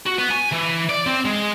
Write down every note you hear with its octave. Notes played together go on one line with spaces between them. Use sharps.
F#4
B3
G#5
E3
D5
C4
G#3